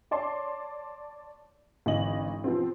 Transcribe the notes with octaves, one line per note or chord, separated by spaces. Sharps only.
C#5 D5 A5 C6
G#1 D3 E3 D#5 F#7
F3 B3 C4